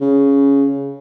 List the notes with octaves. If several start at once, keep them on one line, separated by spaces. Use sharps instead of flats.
C#3